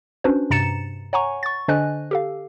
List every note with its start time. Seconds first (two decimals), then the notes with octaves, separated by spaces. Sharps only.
0.24 C#4 D4 F#4 B4 C5
0.50 G2 C3 A#5 A6 C#7 E7
1.13 C#5 F#5 G#5 A#5 C#6
1.43 C#6 A6
1.68 D3 D4 C5 D#5 G#5 F#6
2.11 G4 A4 F5